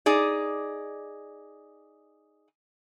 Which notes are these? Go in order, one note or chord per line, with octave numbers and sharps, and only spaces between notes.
D#4 G#4 D5